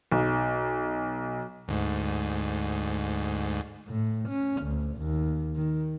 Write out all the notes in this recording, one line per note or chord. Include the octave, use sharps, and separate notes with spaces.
B1
D2 G#2
A2
C#4
D2
D#2
D#3